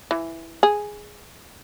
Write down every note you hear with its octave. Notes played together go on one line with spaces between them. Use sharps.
E3
G#4